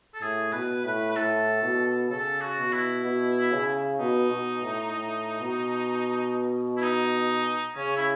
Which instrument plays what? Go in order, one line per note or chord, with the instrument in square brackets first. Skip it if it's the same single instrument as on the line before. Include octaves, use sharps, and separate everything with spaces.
[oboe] A4
[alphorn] A2 [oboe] G#4
[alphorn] B2 [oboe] B4
[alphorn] A2 [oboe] B4
[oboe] B4
[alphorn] A2 [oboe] A4
[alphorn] B2
[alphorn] C#3 [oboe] A4
[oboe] F#4
[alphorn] B2
[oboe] E4
[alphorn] B2
C#3
[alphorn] B2 [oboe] D#4
[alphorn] B2
A2
A2
B2
[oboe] E4
D#4
[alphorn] C#3 [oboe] C#4
[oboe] E4